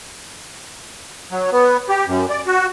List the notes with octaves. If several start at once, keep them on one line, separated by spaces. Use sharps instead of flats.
F#3
B3
G4
F#2
D5
F#4